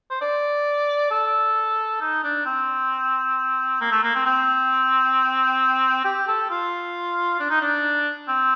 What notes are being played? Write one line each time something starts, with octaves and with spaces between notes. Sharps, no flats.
C5
D5
A4
D#4
D4
C4
A#3
A3
A#3
C4
C4
G4
A4
F4
D4
D#4
D4
C4